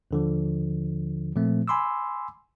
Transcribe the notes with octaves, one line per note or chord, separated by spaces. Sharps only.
D#2 D3 F3
A#2 F3 A3 C4
G#5 B5 C6 D6 E6